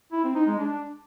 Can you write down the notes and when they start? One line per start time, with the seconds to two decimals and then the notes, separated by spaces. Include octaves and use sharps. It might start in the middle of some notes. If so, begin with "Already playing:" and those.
0.12 E4
0.24 C4
0.35 D#4
0.47 G#3
0.58 D4